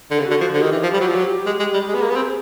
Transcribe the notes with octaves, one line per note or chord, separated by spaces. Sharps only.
D3
C#3 F#4
D3
F3
D3
D#3 G4
E3
F3
G3
F#3
F3
F#3
G#3
G#3
G3
G#3 G#4
B3
A#3
B3
C4